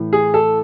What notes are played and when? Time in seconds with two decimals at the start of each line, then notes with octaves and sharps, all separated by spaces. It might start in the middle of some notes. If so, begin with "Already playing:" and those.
Already playing: A2 E3
0.13 G#4
0.34 A4